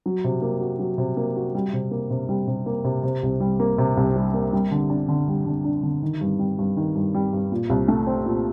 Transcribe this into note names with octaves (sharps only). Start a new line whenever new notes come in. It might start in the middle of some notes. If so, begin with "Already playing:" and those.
F#3
C3
A#3
F#4
F#3
C3
A#3
F#4
G3
C3
A#3
C3
G3
C3
A#3
C3
C3
C2
G3
A#3
C3
C2
G3
A#3
G3
D3
D4
D3
G3
D3
D4
D3
D#3
G2
G3
G2
D#3
G2
G3
G2
A#2
C2
A3
C4
A#2